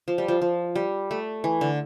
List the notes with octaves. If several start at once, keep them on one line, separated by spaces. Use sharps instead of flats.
F3
G3
F3
F3
G3
A3
E3
D3